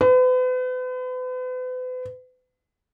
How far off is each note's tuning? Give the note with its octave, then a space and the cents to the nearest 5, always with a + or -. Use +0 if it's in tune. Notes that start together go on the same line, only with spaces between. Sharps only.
B4 +40